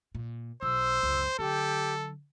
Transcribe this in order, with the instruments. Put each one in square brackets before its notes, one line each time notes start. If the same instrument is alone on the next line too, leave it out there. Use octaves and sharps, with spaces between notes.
[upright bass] A#2
[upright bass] B1 [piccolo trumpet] C5 [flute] E6
[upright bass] C#2 F#2
[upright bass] D3 F#3 [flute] G4 [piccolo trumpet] A4